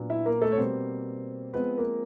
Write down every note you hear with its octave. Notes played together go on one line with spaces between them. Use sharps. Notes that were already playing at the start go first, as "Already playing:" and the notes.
Already playing: A#2 F#3 B3 D4
E4 E5
A#3 A#4
A3 A4
C#5
B2 G3 A#3 C4 C5
F3 G#3 B3 C4 B4
A#3 A#4